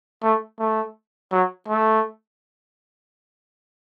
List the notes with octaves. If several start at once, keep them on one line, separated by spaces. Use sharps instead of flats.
A3
A3
F#3
A3